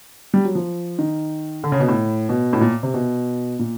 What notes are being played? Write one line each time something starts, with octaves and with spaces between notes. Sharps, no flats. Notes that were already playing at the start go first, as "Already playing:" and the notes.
G3
F#3
F3
D#3
D3
C#3
B2
A2
B2
A2
A#2
C3
B2
A#2